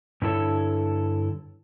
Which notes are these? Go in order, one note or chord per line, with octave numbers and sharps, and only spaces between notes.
G2 D3 E4 A4 C#5